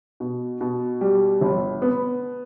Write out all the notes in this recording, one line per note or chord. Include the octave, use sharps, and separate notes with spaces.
B2
B2
G3
G1
B3